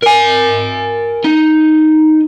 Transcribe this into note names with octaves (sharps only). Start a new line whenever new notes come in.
A#4 G#5
D#4